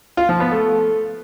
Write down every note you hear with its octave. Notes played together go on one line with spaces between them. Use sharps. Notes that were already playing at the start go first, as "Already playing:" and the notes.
F4
F3
B3
A3